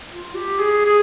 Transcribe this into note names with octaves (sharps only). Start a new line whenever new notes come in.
F4
G4
G#4
G#4